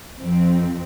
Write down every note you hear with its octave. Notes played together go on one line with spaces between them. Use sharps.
F2 C4